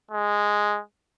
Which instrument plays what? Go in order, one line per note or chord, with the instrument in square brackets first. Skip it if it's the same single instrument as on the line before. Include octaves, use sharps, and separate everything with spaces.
[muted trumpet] G#3